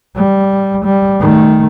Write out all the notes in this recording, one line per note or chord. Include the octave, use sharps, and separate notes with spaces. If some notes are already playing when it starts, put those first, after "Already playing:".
G3
G3
D#3 A3